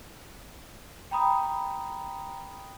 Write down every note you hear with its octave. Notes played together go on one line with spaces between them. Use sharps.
G5 A#5 B5 D#6